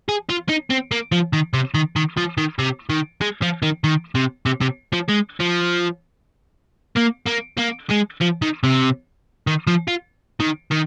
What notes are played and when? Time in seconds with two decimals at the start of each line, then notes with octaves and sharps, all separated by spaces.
0.09 G#4
0.30 F4
0.49 D#4
0.70 C4
0.92 A#3
1.12 F3
1.33 D#3
1.54 C3
1.75 D#3
1.96 D#3
2.17 F3
2.38 D#3
2.59 C3
2.89 D#3
3.21 G#3
3.42 F3
3.62 D#3
3.84 D#3
4.15 C3
4.46 C3
4.61 C3
4.93 F3
5.09 G#3
5.40 F3
6.97 A#3
7.27 A#3
7.59 A#3
7.91 G#3
8.21 F3
8.42 D#3
8.63 C3
9.47 D#3
9.67 F3
9.88 F4
10.40 D#3
10.71 D#3